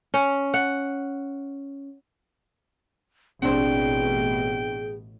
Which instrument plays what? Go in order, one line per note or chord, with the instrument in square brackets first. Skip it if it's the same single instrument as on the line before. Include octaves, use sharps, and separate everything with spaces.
[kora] C#4
F#5
[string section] A1 B2 [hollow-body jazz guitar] C4 D4 C5 [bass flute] G#4 [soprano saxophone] G5